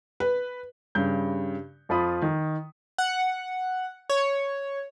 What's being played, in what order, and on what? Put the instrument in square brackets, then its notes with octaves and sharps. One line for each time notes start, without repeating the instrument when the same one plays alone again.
[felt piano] B4
[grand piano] G2 C#3 G3 G6
F2 F3 F4 B5 D#6
D#3
[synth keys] F#5
C#5